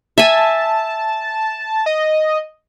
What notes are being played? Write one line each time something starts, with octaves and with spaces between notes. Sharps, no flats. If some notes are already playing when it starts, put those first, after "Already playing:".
E5 G#5 A5
D#5